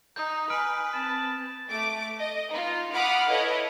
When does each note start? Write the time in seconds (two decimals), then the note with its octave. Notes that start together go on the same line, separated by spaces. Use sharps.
0.16 D#4 D#6 G6
0.50 B4 G#5 F6 D7
0.94 C4 A5
1.70 A3 D6
2.20 D#5
2.51 D#4 F4
2.93 F5 F#5 B5 D6 D#6 F6
3.29 E4 A4 B4 C#5 D#5